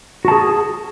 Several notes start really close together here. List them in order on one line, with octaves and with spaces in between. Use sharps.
F#4 A5 G#4